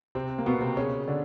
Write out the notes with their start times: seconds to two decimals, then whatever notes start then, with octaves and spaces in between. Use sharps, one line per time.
0.15 C3 C4
0.38 A#3
0.46 B2 B3
0.61 C3 C4
0.77 C#3 C#4
1.08 D3 D4